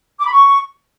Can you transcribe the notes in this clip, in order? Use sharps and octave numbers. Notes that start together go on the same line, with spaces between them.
D6
B5
C#6